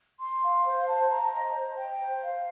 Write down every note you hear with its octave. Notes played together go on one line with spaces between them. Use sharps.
C6
F5
C5
A5
A#5
D#5
C5
G5
C5
F5